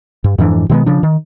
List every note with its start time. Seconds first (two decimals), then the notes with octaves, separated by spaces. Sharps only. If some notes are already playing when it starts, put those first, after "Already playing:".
0.24 G2
0.38 F2 G#2 E3 D4
0.69 B2 D#3 G#3 B3
0.86 C#3 F3 D4
1.03 D#3